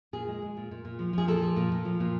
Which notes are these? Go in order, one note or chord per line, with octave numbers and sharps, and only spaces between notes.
A#2 G#4
G#3
G#3
A#2
A#2
A#2
F3
F3 G#4
A#2 A4
F3
A#2
A#2
F3
A#2